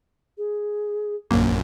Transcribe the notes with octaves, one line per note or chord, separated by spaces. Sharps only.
G#4
A#1 F#2 A#3